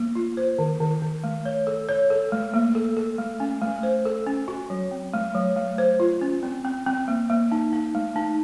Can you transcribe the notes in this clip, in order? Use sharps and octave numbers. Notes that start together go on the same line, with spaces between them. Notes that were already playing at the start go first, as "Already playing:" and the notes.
Already playing: A#3
F4
C5
D#3
D#3
D#3
A3
C#5
A4
C#5
A4
A3
A#3
A4
A4
A3
C#4
A3
C5
A4
C#4
F#4
F#3
C4
A3
F#3
A3
C5
F4
C#4
C4
C4
C4
A#3
A#3
D#4
D#4
A3
D#4